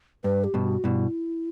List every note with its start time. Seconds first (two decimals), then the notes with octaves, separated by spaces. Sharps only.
0.24 G2 B4
0.44 G4
0.54 G2 B2
0.64 F#4
0.84 G2 B2 E4